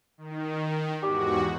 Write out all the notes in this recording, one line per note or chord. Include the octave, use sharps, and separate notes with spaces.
D#3
E2 G#2 F#4 G4